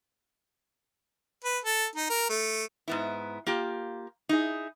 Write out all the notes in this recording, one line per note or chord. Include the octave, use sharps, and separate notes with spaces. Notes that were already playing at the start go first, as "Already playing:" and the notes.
B4
A4
D#4
A#4
A3
G#2 B3 E4
A#3 F4 G4
D#4 E4 G#4